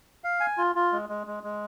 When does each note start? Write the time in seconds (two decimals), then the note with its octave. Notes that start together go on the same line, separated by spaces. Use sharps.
0.24 F5
0.40 G#5
0.58 F4
0.75 F4
0.93 G#3
1.09 G#3
1.27 G#3
1.43 G#3